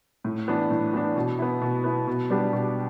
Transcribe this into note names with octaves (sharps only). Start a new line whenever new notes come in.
A2
E3 B3 D4
A2
E3 B3 D4
B2
B3 E4
B2
B3 E4
B2
G3 B3 D4 G4
B2